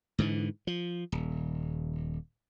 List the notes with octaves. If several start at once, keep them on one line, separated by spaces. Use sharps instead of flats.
G#2 D3 E3
F3
D#1